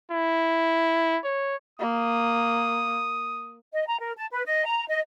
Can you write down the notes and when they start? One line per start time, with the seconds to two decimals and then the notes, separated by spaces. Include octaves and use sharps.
0.11 E4
1.24 C#5
1.80 A#3 D#6
3.72 D#5
3.87 A#5
3.99 A#4
4.17 A5
4.30 B4
4.46 D#5
4.65 A#5
4.88 D#5